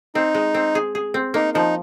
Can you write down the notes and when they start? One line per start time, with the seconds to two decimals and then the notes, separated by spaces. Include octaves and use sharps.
0.15 C4 D#4
0.35 G#3
0.54 C4
0.75 G#4
0.95 G#4
1.14 C4
1.34 A#3 D#4
1.54 F3 D#4